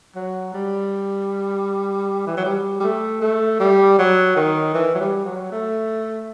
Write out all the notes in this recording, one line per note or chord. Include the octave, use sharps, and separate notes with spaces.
F#3
G3
E3
F#3
G3
G3
A3
A3
G3
F#3
D#3
E3
F#3
G3
F#3
A3